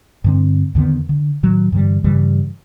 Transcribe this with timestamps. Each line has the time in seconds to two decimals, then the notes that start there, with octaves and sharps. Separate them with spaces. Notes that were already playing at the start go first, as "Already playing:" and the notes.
0.24 G2 D3 C4
0.75 E2 D3 D#3 B3
1.09 D3
1.43 A2 D#3 F#3
1.72 G2 D3 E3 G3
2.04 G2 C#3 E3 G3